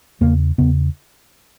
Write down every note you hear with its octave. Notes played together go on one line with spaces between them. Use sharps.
E2 C#3 A#3
E2 C#3 B3